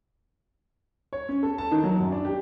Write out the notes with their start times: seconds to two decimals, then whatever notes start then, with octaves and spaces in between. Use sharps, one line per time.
1.13 C#5
1.29 C#4
1.43 A4
1.58 A5
1.71 D#3
1.84 F#3
2.00 F#2
2.12 D4
2.25 G4